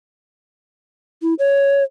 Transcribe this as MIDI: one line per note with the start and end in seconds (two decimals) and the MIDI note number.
1.22 1.34 64
1.39 1.83 73